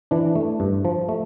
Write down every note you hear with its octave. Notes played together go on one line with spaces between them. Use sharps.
E3 D4
A3
G2
F3
A3